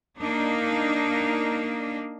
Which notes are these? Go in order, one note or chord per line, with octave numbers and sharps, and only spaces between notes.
A#3 D4 D#4